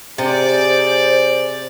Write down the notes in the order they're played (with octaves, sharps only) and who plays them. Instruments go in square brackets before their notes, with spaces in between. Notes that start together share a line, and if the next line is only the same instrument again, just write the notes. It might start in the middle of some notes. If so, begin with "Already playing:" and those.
[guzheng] C3 [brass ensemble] G#4 D5 [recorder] C5